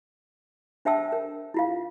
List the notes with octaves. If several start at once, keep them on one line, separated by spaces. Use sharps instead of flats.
D4 C5 E5 G5 A5 E6
A#4
E4 F4 F5